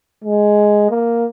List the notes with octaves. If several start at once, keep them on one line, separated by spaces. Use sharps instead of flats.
G#3
A#3